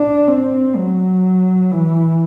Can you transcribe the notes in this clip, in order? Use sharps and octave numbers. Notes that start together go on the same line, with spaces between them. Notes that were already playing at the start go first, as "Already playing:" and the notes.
Already playing: D4
C4
F#3
E3